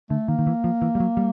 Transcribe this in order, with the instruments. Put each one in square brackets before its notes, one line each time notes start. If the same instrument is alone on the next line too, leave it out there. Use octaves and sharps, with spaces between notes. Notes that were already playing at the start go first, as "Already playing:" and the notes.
[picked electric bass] D3 [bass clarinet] A3
[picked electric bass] D#3 [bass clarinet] A#3
[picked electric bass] D#3
E3
F3
E3
G3
F#3
G3